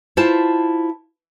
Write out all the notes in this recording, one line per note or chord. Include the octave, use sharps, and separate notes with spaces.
E4 F4 C5 A5